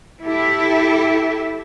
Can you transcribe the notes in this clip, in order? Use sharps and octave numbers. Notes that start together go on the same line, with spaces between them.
E4 G4 A4 E5